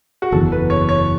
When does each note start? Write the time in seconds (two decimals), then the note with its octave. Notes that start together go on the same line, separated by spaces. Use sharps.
0.22 F#4
0.32 F#1 E2 E3 A4
0.52 B4
0.70 C#5
0.89 C#5